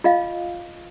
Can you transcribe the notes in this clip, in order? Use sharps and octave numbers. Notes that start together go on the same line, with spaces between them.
F4 D#5 F5